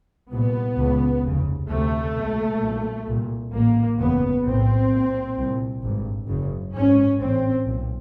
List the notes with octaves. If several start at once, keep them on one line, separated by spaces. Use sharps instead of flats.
C2 A#2 B3
C#2 C#3
F1 D#2 C#3
D2 C3 A3
B1 B2
B1 A#2
C2 A#2
A1 A2 A#3
F#1 E2 C#3 B3
B1 A2 C4
B1 A#2
C2 A#2
G#1 G2
F#1 F#2 C#3
G#1 G#2 C#4
A1 A2 C4
B1 A#2